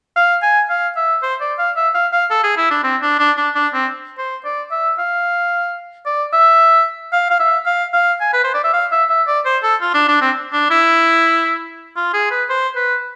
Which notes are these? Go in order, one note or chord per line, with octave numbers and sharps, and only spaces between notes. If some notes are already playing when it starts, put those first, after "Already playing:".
F5
G#5
F5
E5
C5
D5
F5
E5
F5
F5
A4
G#4
E4
D4
C4
D4
D4
D4
D4
C4
C5
D5
E5
F5
D5
E5
F5
F5
E5
F5
F5
G#5
B4
C5
D5
E5
F5
E5
E5
D5
C5
A4
F4
D4
D4
C4
D4
E4
F4
G#4
B4
C5
B4